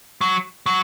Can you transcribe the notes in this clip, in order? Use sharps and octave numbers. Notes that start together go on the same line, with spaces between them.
F#3
F#3